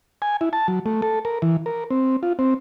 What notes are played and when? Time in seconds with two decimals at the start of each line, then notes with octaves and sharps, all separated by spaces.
0.22 G#5
0.41 E4
0.53 A5
0.68 F#3
0.86 A3
1.02 A4
1.25 A#4
1.42 E3
1.66 A#4
1.91 C4
2.23 F4
2.39 C4